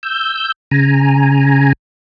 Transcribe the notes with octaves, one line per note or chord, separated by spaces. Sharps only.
E6 G6
C#3 G#5 A#5